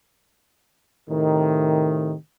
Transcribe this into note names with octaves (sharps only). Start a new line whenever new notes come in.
A2 C3 D#3